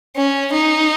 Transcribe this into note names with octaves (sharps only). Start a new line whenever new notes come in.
C#4
D#4